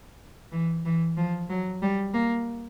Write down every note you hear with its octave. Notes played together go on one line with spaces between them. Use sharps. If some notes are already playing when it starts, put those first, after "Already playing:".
E3
E3
F3
F#3
G3
A#3